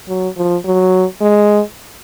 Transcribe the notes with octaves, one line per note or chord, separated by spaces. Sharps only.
F#3
F3
F#3
G#3